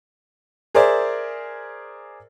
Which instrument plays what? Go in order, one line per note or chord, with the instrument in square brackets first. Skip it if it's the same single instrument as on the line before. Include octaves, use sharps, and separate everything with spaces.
[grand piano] G#4 A#4 C5 D5 E5